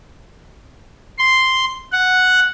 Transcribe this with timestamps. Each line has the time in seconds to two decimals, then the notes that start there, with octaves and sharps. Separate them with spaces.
1.18 C6
1.92 F#5